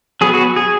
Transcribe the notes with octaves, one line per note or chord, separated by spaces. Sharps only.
F#3 B3 G#4
F#4
G#4